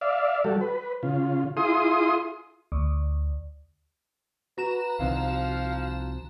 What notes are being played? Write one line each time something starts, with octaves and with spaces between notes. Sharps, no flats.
D5 E5 F5
G3 F#4 A4
B4
C#3 F4
E4 F4 G#4 C6 D#6
D2
F#4 B4 A#5 E7
C2 C3 D#3 F3 F5